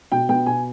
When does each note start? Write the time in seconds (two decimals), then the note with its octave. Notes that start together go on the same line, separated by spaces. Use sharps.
0.12 B2 G5
0.29 B3 G5
0.46 B2 G#5